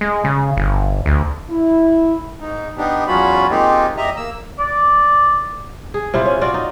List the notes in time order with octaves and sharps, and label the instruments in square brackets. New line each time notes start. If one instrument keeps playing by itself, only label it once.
[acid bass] G#3
C#3
G1
D2
[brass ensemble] E4
[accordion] G#2 D#4
B3 D4 D#4 G4
E2 F#3 C#4 F4 F#4 B5
G#3 A#3 C4 D#4 F4 G4
E2 G4 D#5 E5 A#5
A#3 E6
[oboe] D5
[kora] G#4
C3 E4 F4
C#4
F4 F#4 D5
D#4